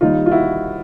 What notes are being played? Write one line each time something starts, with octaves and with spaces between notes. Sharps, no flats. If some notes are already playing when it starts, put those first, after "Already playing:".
D#2 D#3 G3 D#4 F4
F4
E4 F#4